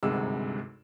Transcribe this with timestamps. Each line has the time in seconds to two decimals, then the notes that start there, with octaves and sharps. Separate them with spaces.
0.03 G#1 D2 G2 C3 G#3 E6